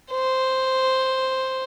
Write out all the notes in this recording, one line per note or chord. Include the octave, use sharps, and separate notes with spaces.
C5